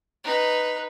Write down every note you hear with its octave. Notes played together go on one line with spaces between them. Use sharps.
D#4 B4